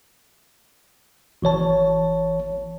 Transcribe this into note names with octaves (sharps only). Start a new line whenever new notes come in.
G#1 E3 C#5 A5